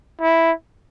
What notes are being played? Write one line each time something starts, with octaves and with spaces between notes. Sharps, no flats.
E4